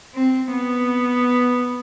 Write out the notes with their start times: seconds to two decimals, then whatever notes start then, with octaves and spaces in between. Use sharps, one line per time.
0.15 C4
0.53 B3